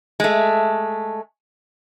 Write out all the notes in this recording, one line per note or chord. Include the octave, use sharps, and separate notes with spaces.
G#3 A3